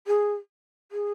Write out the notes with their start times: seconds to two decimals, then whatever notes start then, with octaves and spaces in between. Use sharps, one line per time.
0.07 G#4
0.92 G#4